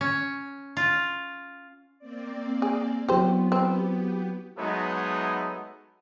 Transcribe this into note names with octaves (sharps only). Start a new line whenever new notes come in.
C#4
F4
A#3 C4 D5
G#4
F#3 B3 E4 F#4 G4 C5
B3 C4 G4 B4
F#3 G#3 A3 B3 D#4